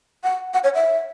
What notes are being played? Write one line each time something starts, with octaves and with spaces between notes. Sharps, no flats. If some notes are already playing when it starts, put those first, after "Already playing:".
F#5
F#5
C#5
E5